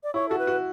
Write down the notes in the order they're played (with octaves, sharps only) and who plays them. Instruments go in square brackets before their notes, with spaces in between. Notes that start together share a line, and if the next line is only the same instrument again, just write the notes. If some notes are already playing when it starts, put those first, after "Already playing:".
[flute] D5
[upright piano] E4 [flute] C#5
[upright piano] F#4 [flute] A4
[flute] B4
[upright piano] F#4